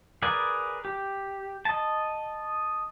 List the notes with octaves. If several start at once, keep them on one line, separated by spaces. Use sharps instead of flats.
G#4 A#4 B4 D5 G#5
G4
D#5 A5